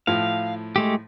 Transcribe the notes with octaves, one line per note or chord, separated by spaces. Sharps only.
A2 F3 F5
G#3 A3 G4